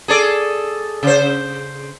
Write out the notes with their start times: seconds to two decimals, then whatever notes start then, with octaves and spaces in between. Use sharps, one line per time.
0.08 G#4 A4 D5
1.03 C#3 C5